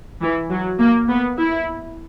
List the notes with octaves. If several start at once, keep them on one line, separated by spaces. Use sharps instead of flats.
E3
F#3
A#3
B3
E4